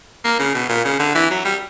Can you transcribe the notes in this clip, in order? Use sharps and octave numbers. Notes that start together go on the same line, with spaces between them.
A#3
C#3
B2
A#2
C#3
D3
E3
F#3
G3